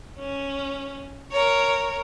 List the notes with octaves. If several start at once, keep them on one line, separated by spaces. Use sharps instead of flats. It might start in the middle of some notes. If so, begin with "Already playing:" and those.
C#4
A#4 C#5